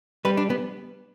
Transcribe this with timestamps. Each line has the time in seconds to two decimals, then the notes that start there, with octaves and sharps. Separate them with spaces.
0.25 G3 B4
0.37 D4
0.50 B3